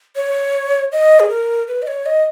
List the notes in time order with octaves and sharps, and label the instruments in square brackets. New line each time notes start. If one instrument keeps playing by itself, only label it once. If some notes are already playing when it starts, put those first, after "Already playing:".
[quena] C#5
D#5
G#4
A#4
B4
D#5
C#5
D#5